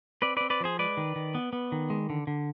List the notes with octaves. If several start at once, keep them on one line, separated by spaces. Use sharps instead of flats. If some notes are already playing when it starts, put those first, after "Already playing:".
C4 B4 D5
C4 B4 D5
B4 D5
F3 G#4 C5
G#3 B4 D5
D#3
D#3
B3
B3
D#3
G#3
D3
D3